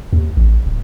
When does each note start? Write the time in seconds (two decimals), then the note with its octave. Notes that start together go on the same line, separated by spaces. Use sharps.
0.13 D#2
0.37 A1
0.66 D1